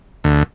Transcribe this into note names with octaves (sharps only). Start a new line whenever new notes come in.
D2